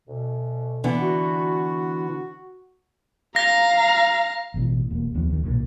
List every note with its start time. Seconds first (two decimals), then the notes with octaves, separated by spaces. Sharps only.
0.08 D2 B2
0.84 D3 E3 B3
1.02 F#4
3.36 F5 A#5 A#6
4.54 A1 B2 E3
4.90 E1 A#3
5.15 D#2 F3 B3 D4
5.30 D#2 D#3
5.44 B1 A#2 D3